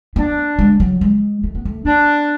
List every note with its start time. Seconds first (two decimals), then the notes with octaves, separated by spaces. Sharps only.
0.16 B3 D4
0.59 G#3
0.80 F#3
1.01 G#3
1.44 A3
1.55 B3
1.65 A3
1.85 B3 D4